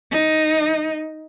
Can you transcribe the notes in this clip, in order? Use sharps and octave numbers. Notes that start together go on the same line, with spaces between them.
D#4